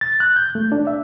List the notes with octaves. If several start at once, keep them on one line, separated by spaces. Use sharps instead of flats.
A6
F#6
G6
A3
D4
E5